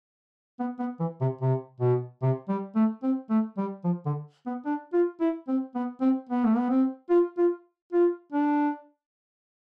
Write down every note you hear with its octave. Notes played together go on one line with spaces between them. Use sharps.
B3
B3
E3
C3
C3
B2
C3
G3
A3
C4
A3
G3
F3
D3
B3
D4
F4
E4
C4
B3
C4
B3
A3
B3
C4
F4
F4
F4
D4